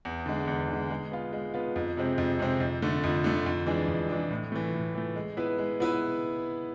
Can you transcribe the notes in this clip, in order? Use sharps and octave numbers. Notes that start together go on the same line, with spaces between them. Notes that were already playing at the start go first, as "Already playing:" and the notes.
E2
D3 G#3
E2
D3
G#3
G#3
B3 F4
G#3
B3 F4
F2
C3 G#3 C4
F2
C3 G#3 C4
F2
D3 A3
F2
D3 A3
F2
E3 G#3 D4
F2
E3 G#3 D4
A2
E3 A3
A2
E3 A3
G#3
B3 E4 B4
G#3
B3 E4 B4